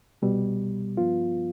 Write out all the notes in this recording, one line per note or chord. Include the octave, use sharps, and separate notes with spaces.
C2 B2 G3
G2 F3 B3 F4